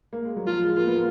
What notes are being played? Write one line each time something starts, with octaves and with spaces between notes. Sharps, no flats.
A#3
G#3
F#3
F3 F4
G#3
A#3 F4
B3
A#3